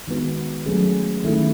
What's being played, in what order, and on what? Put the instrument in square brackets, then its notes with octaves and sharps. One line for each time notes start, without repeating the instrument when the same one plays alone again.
[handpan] D#3 G#3 B3 F#4
F#3 A3 C#4 G#4
D#3 A3 C#4 E4